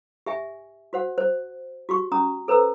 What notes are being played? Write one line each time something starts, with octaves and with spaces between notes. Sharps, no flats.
G4 E5 G#5
F#4 C5 F#5
C5
F#4 G4 C#6
C#4 A#5 D#6
A4 B4 C5 A#5 E6